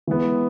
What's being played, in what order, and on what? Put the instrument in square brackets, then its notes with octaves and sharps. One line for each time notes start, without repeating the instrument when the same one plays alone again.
[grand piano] E3 G#3 B3